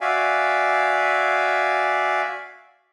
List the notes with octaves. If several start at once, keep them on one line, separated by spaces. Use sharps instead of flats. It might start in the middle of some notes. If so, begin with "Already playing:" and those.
F#4 D5 E5 F5 G#5